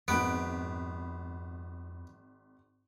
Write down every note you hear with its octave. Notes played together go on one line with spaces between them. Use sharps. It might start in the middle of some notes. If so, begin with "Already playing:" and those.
G#1 F2 B3 F#6 D7